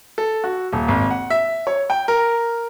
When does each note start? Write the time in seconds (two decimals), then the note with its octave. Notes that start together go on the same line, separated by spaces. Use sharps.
0.18 A4
0.44 F#4
0.73 D#1
0.88 G#1
1.11 F#5
1.30 E5
1.67 C#5
1.90 G5
2.08 A#4